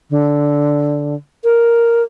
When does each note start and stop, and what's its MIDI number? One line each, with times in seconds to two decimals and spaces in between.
0.10 1.14 50
1.44 2.03 70